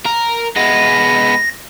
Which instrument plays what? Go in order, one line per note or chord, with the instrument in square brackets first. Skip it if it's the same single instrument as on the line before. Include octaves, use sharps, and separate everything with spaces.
[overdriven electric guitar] A#4
[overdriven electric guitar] G#3 B3 [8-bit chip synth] A#6